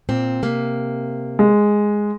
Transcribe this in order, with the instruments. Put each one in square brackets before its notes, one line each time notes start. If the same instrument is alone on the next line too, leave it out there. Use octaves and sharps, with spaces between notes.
[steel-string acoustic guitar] A#2 C4
C3 A#3
[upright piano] G#3